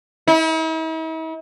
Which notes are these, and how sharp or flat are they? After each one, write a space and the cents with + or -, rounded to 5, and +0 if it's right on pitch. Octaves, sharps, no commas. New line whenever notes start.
E4 -45